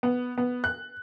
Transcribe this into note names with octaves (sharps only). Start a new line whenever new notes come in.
B3
B3
F#6